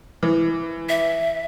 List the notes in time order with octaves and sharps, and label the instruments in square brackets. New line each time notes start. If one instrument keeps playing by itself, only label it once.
[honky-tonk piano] E3
[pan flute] E5